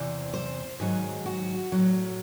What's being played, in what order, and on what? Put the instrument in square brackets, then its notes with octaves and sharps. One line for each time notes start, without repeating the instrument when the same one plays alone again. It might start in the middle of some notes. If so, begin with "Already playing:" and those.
Already playing: [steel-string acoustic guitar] E2 C3 E3 C5
C5
G#2 D#3 F#3 G#4
F#4
A2 F#3